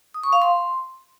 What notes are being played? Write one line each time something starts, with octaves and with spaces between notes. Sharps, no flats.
D#6
C#6
F5
C6